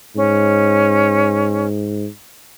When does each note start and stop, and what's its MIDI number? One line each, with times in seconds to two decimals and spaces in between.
0.16 2.07 44
0.16 1.66 61